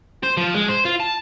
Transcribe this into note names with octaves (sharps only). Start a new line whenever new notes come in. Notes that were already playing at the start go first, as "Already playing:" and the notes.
C5
F3
G#3
C5
F4
A5